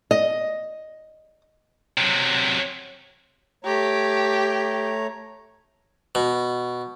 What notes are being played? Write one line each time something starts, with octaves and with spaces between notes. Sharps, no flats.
D#5
C3 F#3
A3 G4 C#5 A#5
B2